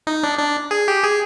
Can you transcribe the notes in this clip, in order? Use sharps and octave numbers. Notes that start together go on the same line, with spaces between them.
D#4
D4
D4
G#4
G4
G#4